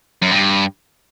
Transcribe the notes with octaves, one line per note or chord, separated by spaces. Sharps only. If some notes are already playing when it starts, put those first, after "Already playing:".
F#2
G2